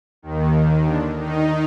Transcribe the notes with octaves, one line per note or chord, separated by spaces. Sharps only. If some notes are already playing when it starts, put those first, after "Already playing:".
D#2 D#3
D3 D4
D#3 D#4